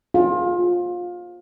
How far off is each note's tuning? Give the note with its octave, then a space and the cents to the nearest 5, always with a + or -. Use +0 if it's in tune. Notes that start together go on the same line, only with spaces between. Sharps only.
F4 +20 G#4 +0